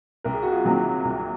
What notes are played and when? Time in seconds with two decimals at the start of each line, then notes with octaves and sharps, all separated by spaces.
0.24 C2 A#4
0.34 G#4
0.43 F#4
0.52 F4 G#4
0.64 C3 D#3 F#3 A#3
1.05 C2